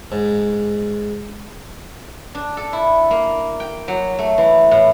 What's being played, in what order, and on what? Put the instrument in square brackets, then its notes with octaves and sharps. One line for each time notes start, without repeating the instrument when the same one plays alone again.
[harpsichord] G#2
[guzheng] D4
A4
E4
A#3
G5
F#3
A3
E3
A2